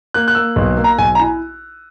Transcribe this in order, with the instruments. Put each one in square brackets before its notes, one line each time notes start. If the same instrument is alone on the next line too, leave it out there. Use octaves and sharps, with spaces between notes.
[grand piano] A#3 [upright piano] F#6
[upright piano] F#6
[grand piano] A#3 [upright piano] E6
[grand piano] B1
A#3
[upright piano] A#5
[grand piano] B1 [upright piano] G#5
[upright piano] A#5
[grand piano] E4 [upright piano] G#5